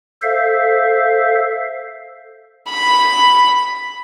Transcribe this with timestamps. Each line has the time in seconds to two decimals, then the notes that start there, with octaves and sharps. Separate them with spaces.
0.22 A4 C5 E5 F5
2.70 B5